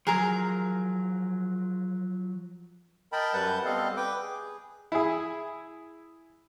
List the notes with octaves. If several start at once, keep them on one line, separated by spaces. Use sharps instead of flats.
F3 F#3 G#4 A#4 A#5
A#4 D#5 G5 A5 B5
F#2 G3 B4 F#5 A5 G6
G3 B3 C4 A4 D#5 F5
B4 G5 D6
G#4
E4 G#4